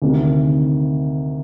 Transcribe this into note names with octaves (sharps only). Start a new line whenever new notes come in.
D2 C3 D#3